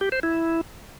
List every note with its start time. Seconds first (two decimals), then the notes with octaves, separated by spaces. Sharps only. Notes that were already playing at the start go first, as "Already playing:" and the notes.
0.01 G4
0.12 C5
0.23 E4